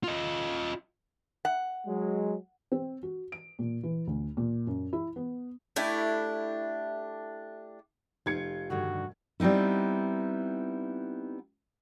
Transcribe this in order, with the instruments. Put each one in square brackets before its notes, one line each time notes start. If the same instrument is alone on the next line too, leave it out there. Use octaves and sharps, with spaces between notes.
[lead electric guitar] F4 D#5
[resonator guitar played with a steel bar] F#5
[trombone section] F#3 G#3
[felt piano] C4
F#4
D7
A#2
E3
D2
A#2
F#2
E4
B3
[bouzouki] A3 D4 E4 G4
[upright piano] F1 G#6 C#7 [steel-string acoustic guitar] F4 [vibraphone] G4
[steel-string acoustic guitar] G2 D3 D#3 [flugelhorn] F#4
[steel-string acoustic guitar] G3 B3 C4 D#4 E4